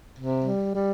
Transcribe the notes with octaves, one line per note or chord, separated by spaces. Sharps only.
C3
G3
G3